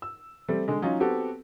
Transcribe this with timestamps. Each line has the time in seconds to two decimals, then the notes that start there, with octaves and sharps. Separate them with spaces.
0.02 E6
0.48 G3 A3 C4
0.68 D3 G#3
0.82 F#3 C#4 D#4 F4
1.00 B3 C4 F#4 G4 A4